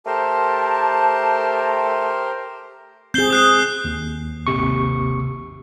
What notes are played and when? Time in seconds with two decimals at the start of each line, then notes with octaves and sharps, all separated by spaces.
0.06 A3 G4 A#4 C5 A5
3.14 C4 G#4 G6 C7 G7
3.30 D#6 F#6 C7
3.84 D#2
4.47 G#1 D#2 C3 C#6